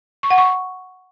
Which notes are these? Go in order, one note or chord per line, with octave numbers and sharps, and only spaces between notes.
C#6
F#5
C#6